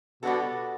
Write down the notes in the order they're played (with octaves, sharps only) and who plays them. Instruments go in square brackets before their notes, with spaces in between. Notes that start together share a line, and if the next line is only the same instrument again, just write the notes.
[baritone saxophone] B2 [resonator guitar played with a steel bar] G3 B3 D4 F#4 A4